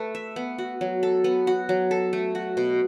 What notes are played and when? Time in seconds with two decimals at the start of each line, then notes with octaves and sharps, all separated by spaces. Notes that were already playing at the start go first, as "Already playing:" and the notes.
Already playing: A3 B4
0.15 E5
0.36 B3
0.58 F#4
0.81 F#3
1.03 A4
1.24 B3
1.47 F#4
1.69 F#3
1.91 A4
2.13 A3
2.35 F#4
2.57 B2